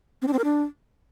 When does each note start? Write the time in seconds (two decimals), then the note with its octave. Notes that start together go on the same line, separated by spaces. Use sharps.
0.22 C4
0.27 D4
0.33 C4
0.39 A#4
0.44 D4